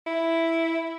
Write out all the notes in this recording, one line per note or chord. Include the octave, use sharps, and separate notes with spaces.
E4